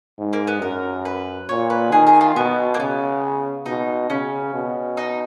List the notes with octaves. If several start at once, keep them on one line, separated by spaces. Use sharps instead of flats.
G#2
A#3
B3
F#2 A#4
B4
A#2 C#5
B4
D#3 G#4
G#4
F4
B2 B3
A#3
C#3 B3
B2 D#4
C#3 C#4
B2
D#4